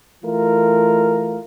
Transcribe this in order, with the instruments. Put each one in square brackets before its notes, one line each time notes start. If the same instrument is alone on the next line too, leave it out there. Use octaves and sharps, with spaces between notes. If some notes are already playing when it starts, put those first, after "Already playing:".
[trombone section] E3 A3 F4 A#4